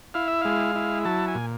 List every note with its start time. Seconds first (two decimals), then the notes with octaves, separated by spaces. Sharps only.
0.14 E4 F5
0.28 E5
0.42 G#3 F5
0.76 E4
1.05 F#3 A5
1.28 G#5
1.35 A#2